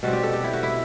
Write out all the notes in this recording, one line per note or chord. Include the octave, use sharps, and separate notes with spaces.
B2 G3 C4 F#4
G4
A4
G4
E4
F#4
E4